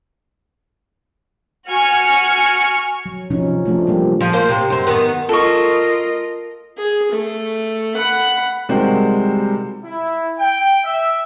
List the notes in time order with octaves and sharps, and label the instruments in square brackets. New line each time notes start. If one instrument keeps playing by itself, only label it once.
[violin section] F#4 G#5 C#6 F6 C#7
[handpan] F#3
C3 F3 F#3 C#4 D#4
F3 A3 D4
F3 G3 A#3 G4
[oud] F3
A#3 C5
C3
F#2 C4
D#3 B3
[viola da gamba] F4 A#4 D#5 [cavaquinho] A4 C#6
[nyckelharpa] G#4
A3
F#5 B5
[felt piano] C3 D#3 G3 G#3 F#4 C5
[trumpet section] E4
G5
E5